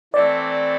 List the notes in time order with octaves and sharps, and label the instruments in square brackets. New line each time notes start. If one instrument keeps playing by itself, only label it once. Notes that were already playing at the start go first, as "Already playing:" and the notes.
[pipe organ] E3 A3 C4 E4 A4 [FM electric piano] D5